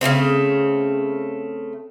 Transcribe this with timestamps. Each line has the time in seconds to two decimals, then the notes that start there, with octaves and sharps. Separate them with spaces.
0.01 C#3 E3 A3 C4